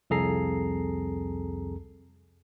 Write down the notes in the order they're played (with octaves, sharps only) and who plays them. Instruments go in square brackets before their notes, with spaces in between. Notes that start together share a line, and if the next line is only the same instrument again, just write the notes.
[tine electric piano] C2 F2 G#4 A4 A#5 C7